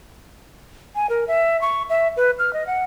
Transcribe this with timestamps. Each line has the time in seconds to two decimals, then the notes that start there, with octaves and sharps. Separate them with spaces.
0.95 G#5
1.09 A#4
1.28 E5
1.61 C#6
1.89 E5
2.17 B4
2.39 F6
2.53 D#5
2.67 F#5